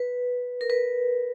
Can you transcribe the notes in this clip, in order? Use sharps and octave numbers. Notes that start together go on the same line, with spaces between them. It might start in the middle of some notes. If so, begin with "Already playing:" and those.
Already playing: B4
A#4
B4